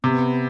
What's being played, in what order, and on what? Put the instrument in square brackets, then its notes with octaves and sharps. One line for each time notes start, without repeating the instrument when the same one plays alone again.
[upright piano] C3 [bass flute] B3